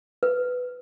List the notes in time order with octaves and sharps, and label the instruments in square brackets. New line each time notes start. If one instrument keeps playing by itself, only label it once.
[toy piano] B4